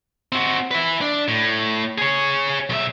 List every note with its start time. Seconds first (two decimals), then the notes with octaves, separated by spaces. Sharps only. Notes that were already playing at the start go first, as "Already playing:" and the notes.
0.32 C4 F#4
0.71 B4 E5
1.01 D4
1.28 A2
1.98 G#4 C#5
2.69 B1 E5